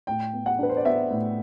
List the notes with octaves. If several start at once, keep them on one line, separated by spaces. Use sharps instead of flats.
A2 G5
B3
F#5
D4 B4
C5
D5
B3 E5
A2